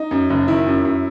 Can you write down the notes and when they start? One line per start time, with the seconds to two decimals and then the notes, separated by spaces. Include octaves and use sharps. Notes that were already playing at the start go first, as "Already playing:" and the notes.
Already playing: D#4
0.11 F#2
0.30 F#1
0.48 D#3 E4
0.67 F#2
0.85 F#2